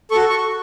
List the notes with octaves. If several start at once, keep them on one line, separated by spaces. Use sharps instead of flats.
F#4 A4 C#6
C#6